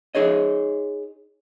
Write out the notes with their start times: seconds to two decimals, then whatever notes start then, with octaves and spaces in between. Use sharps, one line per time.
0.15 D#4 G#4 C#5 D#5